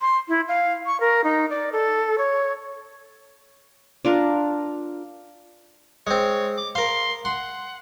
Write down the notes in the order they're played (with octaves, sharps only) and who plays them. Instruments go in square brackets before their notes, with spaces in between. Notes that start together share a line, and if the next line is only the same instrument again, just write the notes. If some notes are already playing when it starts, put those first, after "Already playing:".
[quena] C6
E4
F5
C#6
A#4
D#4
D5
A4
C#5
[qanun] D4 F4 A#4
[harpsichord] G#3 C4 [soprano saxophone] C#5
[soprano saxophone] D6
[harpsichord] A#4 F5 [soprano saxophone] C6
[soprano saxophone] F#5 [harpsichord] C6